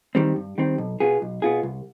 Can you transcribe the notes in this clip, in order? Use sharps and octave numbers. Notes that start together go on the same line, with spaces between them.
D#3 G3 C4
G2
D#3 G3 C4
B1
B2 B3 F4 G#4
B1
B2 B3 F4 G#4
C2